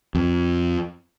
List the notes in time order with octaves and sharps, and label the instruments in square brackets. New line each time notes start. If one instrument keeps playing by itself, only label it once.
[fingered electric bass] F2